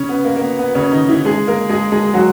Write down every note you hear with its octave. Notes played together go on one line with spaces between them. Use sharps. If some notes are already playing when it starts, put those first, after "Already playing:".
Already playing: C#3 C#4
B3
A#3
A#3
B3
B3
C#3 C#4
D#3 D#4
E3 E4
G#3 G#4
A#3 A#4
G#3 G#4
G#3 G#4
G#4
F#3 F#4